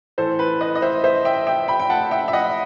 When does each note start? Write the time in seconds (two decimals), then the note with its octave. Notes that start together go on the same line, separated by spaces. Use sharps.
0.18 A2 E3 A4 C5
0.39 B4
0.61 B4 D#5
0.75 D#5
0.82 C5 E5
1.04 C5 E5
1.25 E5 G5
1.47 E5 G5
1.68 G5 B5
1.80 G5
1.90 F#5 A5
2.11 E5 G5
2.28 E5
2.33 D#5 F#5